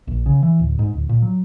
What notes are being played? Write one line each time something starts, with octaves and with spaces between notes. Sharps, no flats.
A#1
C#3
E3
D1
G#2
D1
A#2
F#3